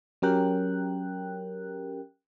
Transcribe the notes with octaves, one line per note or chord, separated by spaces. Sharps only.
F#3 C#4 G4 A#4 G5 F#6